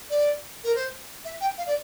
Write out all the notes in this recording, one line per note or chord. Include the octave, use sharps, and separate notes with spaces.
D5
A#4
C5
E5
G5
F5
D5